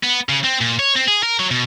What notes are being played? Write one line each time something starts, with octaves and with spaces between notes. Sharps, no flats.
B3
C#3
C4
A#2
C#5
C4
G#4
A#4
F#3
B2